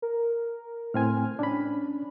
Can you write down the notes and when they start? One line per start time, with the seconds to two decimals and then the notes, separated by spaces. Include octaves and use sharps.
0.02 A#4
0.94 A2 C4 G#5 F6
1.39 C#4 D4 B5